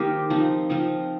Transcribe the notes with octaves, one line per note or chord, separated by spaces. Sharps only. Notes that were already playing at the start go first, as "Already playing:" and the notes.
Already playing: D#3 A#3 D#4 G4 A#4 C5 D#5 G5
F3 C4 D#4
F3 C4 D#4